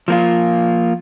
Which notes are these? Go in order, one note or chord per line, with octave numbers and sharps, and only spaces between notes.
F3 A#3 F4